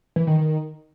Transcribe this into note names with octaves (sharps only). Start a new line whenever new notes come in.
E3
D#3
D#3